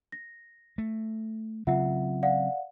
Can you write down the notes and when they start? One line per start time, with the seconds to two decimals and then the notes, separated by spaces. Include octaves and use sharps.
0.12 A#6
0.78 A3
1.67 C#3 F#3 C4 F4 E5 F#5
2.23 D5 F5 F#5